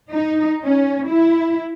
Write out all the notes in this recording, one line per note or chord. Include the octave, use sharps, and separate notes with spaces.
D#4
C#4
E4